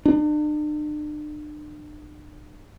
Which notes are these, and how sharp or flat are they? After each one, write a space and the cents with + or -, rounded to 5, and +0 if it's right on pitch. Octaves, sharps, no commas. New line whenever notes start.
D4 +40